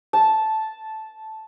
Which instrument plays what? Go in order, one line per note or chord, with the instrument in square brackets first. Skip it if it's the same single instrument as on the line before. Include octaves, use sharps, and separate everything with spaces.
[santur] A5